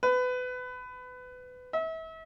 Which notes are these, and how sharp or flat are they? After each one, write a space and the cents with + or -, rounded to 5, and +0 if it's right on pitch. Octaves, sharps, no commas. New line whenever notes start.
B4 +25
E5 -35